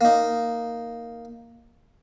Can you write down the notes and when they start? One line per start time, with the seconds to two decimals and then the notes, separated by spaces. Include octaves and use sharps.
0.01 A#3 D#4